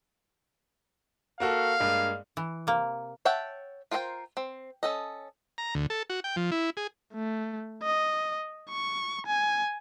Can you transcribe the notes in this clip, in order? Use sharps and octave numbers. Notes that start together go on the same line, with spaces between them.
A#3 F#4 A4 F5
G2 G#3 A#3
E3
C3 A#3
C#5 E5 F#5 G5 A5
F4 A#4 C5 D#5 G5
C4
C#4 A4 D#5
A#5
D2
A4
F#4
G5
F3
E4
G#4
A3
D#5
C#6
G#5